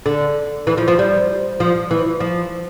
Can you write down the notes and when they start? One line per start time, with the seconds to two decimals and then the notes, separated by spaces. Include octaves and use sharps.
0.06 D3
0.67 E3
0.78 F3
0.88 F3
0.99 G3
1.60 F3
1.91 E3
2.20 F3